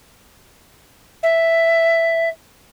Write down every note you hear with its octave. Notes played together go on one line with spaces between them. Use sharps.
E5